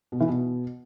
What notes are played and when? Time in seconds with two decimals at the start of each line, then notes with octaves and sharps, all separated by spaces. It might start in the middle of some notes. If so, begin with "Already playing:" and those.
0.12 B2
0.20 E3
0.29 B2